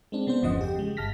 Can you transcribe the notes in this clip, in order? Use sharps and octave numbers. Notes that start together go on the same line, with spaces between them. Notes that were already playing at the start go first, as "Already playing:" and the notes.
G#3 C4 D4
C#3 B3 D4 C5
G1 E2 C#3 F3 D#5 F#5
G4 G5
C#3 G#3
G1 A5 F6 A#6 B6